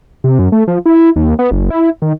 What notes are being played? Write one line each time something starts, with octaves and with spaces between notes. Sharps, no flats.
C3
F#2
A3
F3
E4
D#2
B3
F#1
E4
D#3